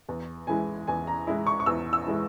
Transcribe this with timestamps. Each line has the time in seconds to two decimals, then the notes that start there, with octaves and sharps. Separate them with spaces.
0.09 E2
0.47 E3 G#3 E4 G#5
0.87 E2 G#5
1.07 A#5
1.27 E3 G#3 E4
1.47 C#6
1.60 C#6
1.66 E2 E6
1.93 E6
2.06 E3 G#3 E4